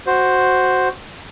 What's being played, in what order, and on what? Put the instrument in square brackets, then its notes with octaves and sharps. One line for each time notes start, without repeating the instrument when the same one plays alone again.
[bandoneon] F#4 C5